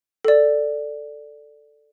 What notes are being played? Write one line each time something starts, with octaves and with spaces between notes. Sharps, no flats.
A4 D5